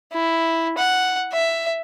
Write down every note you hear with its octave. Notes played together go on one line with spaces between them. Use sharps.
E4
F#5
E5